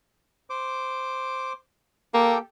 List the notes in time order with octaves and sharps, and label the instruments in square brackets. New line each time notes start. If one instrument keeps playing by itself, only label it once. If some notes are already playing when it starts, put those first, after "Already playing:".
[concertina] C5 D6
[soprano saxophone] A#3 [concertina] G4 A4 G5